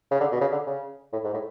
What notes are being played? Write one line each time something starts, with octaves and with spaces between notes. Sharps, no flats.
C#3
D3
B2
C#3
D3
C#3
A2
G#2
A2